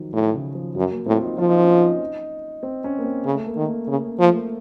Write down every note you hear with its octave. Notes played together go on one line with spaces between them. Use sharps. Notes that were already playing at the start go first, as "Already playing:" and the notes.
Already playing: D#3 F3 F#3
A2
C#3
F3
F#2 F#3
A#3
A2 C4
F4
D#4
F3 F4
D#4
C#4
D#4
C4
C#4
A#3
C4
C#3
A3
A#3
D#3
A#3
C#3
F3 A#3
A3
A#3